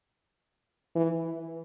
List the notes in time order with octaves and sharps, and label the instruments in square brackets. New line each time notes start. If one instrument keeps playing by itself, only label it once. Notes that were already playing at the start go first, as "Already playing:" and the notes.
[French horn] E3